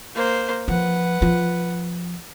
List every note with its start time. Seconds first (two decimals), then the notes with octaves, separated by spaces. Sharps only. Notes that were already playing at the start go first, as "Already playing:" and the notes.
0.15 A#3 C5
0.68 F3 B4 F#5
1.22 F3